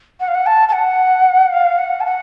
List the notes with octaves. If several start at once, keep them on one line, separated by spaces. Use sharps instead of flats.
F#5
F5
F#5
A5
A5
F#5
F5
F#5
A5
F#5